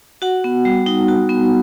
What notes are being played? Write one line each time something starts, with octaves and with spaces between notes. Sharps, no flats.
F#4 F#5
B3
G3
D#4
F#4
B3